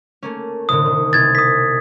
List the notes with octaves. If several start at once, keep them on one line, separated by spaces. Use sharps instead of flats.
A3 A#3 C#4
C2 A2 D3 D#6
D#3
C2 B2 G#6 A6
D#6 B6